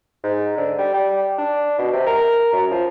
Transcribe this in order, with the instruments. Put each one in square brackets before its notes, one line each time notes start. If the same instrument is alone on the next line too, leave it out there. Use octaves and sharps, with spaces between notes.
[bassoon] G#2
D3
G3
G3
D4
B2
C3
A#4
F#2
F3